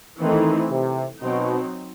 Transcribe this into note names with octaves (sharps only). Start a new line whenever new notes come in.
D#3 E3 A3 C4 D#4 A4
C3
B2 F#3 C4 D#4